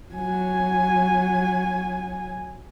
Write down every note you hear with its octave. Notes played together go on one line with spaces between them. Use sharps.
F#3 G#5